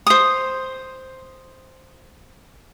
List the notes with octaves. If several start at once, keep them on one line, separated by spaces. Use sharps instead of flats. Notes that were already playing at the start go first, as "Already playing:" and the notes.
C5 D#6